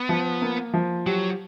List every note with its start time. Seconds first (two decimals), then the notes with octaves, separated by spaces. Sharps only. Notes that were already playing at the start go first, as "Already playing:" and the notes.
Already playing: B3
0.09 F3
0.42 A#3
0.73 F3
1.06 F#3 G4